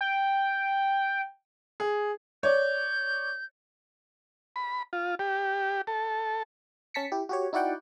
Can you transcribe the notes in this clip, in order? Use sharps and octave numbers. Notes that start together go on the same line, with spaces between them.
G5
G#4
C#5 D5 G6
B5
F4
G4
A4
C#4 A5 B6 C#7
E4 G4
F#4 G4 C#5
D#4 E4 F#4 D5 F#5 G5